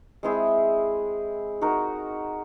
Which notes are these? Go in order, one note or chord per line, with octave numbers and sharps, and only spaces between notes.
G#3 C4 E4 G#4
D#4 F#4 A#4